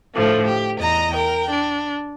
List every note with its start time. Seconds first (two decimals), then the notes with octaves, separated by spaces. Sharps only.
0.14 A2 D3 F3 A3
0.44 G4
0.80 E2 D#5 A#5
1.13 A#4 G5
1.49 D4